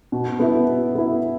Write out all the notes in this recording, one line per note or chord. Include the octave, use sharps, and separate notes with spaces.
B2
B3 E4
B2
B3 E4